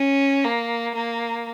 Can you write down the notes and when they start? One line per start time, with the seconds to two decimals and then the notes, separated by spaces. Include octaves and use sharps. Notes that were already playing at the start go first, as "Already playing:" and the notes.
Already playing: C#4
0.44 A#3
0.95 A#3